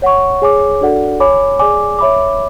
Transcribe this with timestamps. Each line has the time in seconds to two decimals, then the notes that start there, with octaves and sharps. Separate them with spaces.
0.02 C#5 F#5 C#6
0.42 G#4 C#5 G#5 D6
0.81 D4 F#4 A4 D5 F#5
1.20 C#5 G#5 B5 D6
1.59 G#4 D5 G#5 D6
1.99 C#5 E5 B5 D6